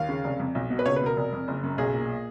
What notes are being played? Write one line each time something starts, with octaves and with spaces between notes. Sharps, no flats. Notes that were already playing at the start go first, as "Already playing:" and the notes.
Already playing: D#2 F5
C#3
F1
F2
B1
B2
B4
C#2 C#5
B4
B2 A#4
F1
F2
F#1
F#2
B1 G#4
A#2